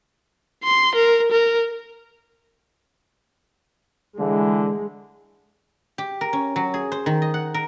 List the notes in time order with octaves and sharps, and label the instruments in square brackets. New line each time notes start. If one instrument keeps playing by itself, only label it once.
[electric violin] C6
A#4
A#4
[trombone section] D3 E3 [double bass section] G#3
[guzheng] G4
A#4
C#4
F#3
G#4
C5
D#3
D#5
F#5
A#4